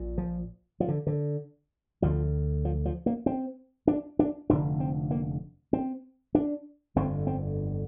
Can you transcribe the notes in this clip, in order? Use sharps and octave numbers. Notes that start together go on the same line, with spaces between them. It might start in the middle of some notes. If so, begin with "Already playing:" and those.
Already playing: A#1 A#2
F3
F3
D3
D3
D2 D3 F3
F3
F3
A#3
C4
D4
D4
F1 F2 D3 D4
C4
A#3
C4
D4
G1 F2 D3 C4
C4